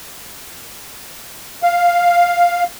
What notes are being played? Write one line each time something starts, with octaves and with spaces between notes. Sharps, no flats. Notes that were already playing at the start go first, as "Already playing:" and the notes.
F5